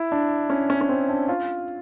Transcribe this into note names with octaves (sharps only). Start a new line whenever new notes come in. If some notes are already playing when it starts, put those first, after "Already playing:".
Already playing: E4
D4
C#4
C#4
C#4
C4
D4
F4